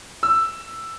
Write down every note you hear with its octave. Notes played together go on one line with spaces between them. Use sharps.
E6